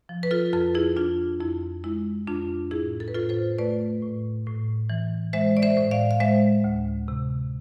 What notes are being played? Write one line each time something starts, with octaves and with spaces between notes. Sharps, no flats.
F3
B4
F4 A4
F2 F4 A4
E4 G#4
F2 D4 F4
F2 E4
G#3 E4
F2 D4 F4
A2 E4 G#4
A4
B4
A2 F4 A4
A4 C5
A3 B4 D5
A2
A2
E3
G#3 C5 E5
D5
C5 E5
A2
D5 F5
F5
G#3 C5 E5
D2
C3